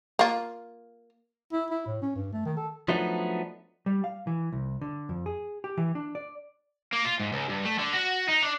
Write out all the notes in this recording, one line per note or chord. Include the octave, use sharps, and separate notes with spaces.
A#3 F4
E4
E4
A2
C#4
G2
A3
D#3
A4
F3 F#3 A3 B3 D4 D#4
G3
F5
E3
C2
D3
F2
G#4
G4
E3
D4
D5
A#3
F4
G#2
C#2
G2
A3
D3
F#4
D#4
D4